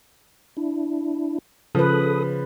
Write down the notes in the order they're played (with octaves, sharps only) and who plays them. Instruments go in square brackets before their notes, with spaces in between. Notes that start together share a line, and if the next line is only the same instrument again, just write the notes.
[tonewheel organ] D4 E4
[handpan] C#3 B4 [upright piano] F3 [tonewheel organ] A4 D#6